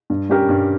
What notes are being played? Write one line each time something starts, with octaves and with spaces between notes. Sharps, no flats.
G2
G3 C#4 G4 A#4
G2